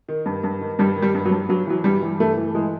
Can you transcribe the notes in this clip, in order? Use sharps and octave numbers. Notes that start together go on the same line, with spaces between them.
D#3
G2
G2
D#3
G2 G3
D#3
G3
G2
F#3
G2
G2 F#3
E3 F#3
G2 G3
E3
G2 A3
E3
E3 G#3